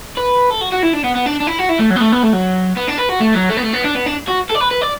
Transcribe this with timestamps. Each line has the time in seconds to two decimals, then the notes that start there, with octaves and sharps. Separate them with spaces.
0.17 B4
0.51 A4
0.61 F#4
0.72 F#4
0.83 E4
0.93 D4
1.04 B3
1.15 B3
1.26 D4
1.40 D4
1.47 E4
1.59 F#4
1.69 E4
1.80 A3
1.91 F#3
1.96 B3
2.01 A3
2.12 B3
2.23 A3
2.33 F#3
2.77 B3
2.88 D4
2.98 B4
3.09 F#4
3.20 A3
3.34 F#3
3.49 A3
3.57 B3
3.63 A3
3.73 B3
3.85 D4
3.96 B3
4.06 D4
4.28 F#4
4.50 A4
4.55 D5
4.60 B4
4.71 B4
4.82 D5